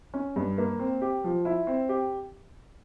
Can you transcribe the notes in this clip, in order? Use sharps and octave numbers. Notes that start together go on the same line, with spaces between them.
C#4
G2
A#3
C4
G4
F3
E4
C4
G4